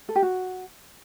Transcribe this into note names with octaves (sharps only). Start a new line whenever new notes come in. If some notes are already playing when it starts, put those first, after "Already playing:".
A4
G4
F#4